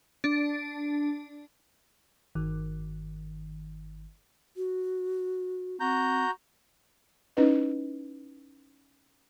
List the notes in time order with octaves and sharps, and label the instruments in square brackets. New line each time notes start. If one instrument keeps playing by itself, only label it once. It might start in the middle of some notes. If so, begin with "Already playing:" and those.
[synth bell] D4
[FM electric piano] G1 D#3
[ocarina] F#4
[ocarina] C4 [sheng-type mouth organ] F#4 A#5 G6
[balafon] C#4 D#4 E4 B4 D#5